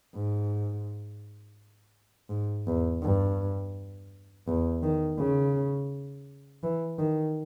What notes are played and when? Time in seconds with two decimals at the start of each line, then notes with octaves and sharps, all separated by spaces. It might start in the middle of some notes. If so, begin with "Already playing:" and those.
0.14 G#2
2.29 G#2
2.67 E2
3.02 G2
4.47 E2
4.83 D#3
5.18 C#3
6.63 E3
6.99 D#3